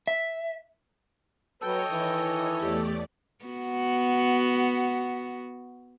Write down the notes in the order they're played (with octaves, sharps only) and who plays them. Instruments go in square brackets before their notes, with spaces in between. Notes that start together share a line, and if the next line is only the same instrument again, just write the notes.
[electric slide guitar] E5
[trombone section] F#3 B4 [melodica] A4 [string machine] C#5 D#5 [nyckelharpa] G5
[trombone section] D#3 E3
[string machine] E2 A3 D5 [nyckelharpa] G4
[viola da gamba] B3 F#4